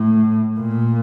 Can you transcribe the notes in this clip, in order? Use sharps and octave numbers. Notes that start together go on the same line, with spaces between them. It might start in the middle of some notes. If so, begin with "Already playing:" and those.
Already playing: A2
A#2